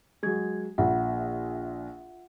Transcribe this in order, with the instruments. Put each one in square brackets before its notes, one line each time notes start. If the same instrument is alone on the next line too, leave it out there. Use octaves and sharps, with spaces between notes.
[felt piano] F#3 G#3 [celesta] G#4 G#6
[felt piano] A#1 [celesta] F4 E5 F#5